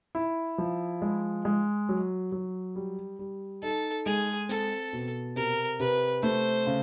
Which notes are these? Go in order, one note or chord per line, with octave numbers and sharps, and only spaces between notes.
E4
F3
G#3
G#3
F#3
F#3
G3
G3
D#4 A4
G#3 G#4
C4 A4
B2
C3 A#4
C3 B4
A3 C5
C#3